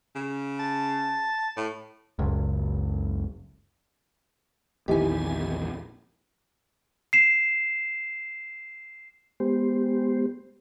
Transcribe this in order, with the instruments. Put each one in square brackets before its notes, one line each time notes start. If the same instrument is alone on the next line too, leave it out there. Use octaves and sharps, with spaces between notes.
[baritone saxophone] C#3
[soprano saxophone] A5
[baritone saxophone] A2
[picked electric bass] F#1 C#2
[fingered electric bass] A#1 E2 [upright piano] D#3 E3 [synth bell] G4 G#5
[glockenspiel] C7 E7
[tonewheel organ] G#3 B3 G4 C5